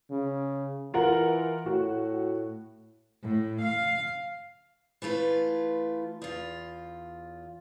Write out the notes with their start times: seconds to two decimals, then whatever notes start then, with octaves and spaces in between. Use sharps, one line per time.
0.10 C#3
0.94 E3 F4 A#4 F#5
1.66 A2 F#4
3.22 A2
3.61 F5
5.02 E3 A3 F4 B4
6.22 E2 F4